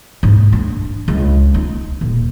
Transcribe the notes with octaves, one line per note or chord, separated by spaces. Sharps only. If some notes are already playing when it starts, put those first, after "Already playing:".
G#2
D4
C#2
D#4
D#1